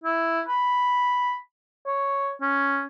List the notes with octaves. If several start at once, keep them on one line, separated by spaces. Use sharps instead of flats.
E4
B5
C#5
C#4